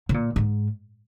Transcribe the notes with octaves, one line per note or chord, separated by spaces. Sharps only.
C3
A#2
G#2